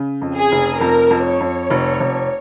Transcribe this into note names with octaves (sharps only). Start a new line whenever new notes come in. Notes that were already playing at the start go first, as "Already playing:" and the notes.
Already playing: C#3
F2
G#4
F1
F2 A#4
F2
C#5
F2
F1
F1